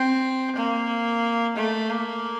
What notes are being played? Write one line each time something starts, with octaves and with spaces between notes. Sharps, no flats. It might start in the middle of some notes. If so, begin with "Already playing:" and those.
Already playing: C4
A#3
A3
A#3